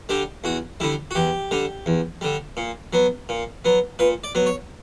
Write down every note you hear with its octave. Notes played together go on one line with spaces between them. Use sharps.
D3 G3 G4
E2 F#4
D3 G3 E4
F#4
E2 G4
D3 G3
E2
D3 G3
A#2
F#3 B3
A#2
F#3 B3
A#2 B4
D5
F#3 B3
C#5